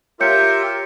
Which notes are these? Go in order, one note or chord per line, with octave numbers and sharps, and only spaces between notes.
F4 G4 A#4 C#5 E5 G6 C#7